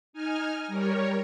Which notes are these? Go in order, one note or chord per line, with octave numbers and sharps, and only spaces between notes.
D#4 G#5 F6
G3 A#4 C#5